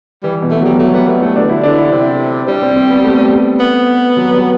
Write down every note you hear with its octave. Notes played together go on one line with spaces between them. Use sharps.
E3 G3
B2
A3
F#3 G3
F#3 A3
G3 B3
A3
E3 A3
D3 D4
E4
D3 D4
E4
C3
G3 D4
C4
C4
B3
A3
B3
F#3
G3